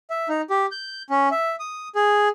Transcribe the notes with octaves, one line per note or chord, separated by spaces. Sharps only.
E5
D#4
G4
G6
C#4
E5
D#6
G#4